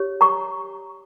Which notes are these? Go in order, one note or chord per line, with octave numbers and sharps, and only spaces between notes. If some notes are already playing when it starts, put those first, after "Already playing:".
Already playing: G4 C#5
A#5 C#6